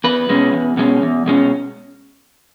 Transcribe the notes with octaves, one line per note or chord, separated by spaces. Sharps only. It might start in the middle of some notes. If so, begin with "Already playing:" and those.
E2 B4
B2 G#3 C#4
E2
B2 G#3 C#4
E2
B2 G#3 C#4